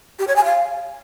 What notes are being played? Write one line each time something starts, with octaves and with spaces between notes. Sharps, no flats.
G4
C#5
G#5
F5